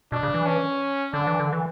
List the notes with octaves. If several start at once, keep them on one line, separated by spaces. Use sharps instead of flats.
B2 D4
C#3
E3
C#4
D3 D4
E3
D3
E3